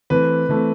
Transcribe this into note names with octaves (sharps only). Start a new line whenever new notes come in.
E3 A3 C4 B4
E3 A3 C4